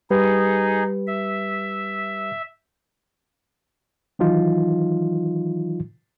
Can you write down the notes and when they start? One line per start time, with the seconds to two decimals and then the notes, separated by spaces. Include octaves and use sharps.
0.10 G3 D#4 G4 G#4 B4
1.07 E5
4.19 D#3 E3 F#3 D#4 F4